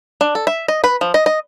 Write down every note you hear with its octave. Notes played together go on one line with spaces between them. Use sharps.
D4
A4
E5
D#5
B4
F3
D#5
D#5